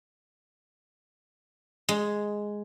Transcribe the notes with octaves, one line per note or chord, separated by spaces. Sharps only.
G#3